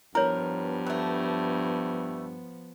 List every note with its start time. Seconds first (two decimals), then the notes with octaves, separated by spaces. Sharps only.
0.15 G2 F3 B3 E4 A#4 C#5
0.86 F#3 A3